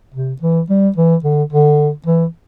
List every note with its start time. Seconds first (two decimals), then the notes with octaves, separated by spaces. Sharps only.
0.14 C3
0.42 E3
0.70 G3
0.96 E3
1.24 D3
1.52 D3
2.06 E3